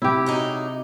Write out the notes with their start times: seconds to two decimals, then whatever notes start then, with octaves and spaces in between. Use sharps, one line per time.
0.02 C3 E4 G4
0.26 F#3 G#3 D#4